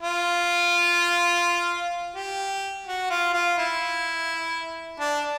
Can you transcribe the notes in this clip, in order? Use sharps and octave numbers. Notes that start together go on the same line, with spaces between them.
F4
G4
F#4
F4
F4
E4
D4